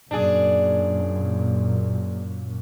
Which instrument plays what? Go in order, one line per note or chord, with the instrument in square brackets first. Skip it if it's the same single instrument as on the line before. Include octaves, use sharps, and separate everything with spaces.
[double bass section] F#2 A#2 [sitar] D4 G#4